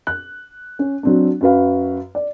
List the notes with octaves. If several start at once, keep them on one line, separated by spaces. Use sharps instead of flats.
F#6
C#4
F#3 C4 D4
F#2 F#4 B4 F5
D5